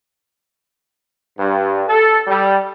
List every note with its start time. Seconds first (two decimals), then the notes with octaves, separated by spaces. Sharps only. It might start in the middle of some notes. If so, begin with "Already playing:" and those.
1.38 G2
1.88 A4
2.28 G3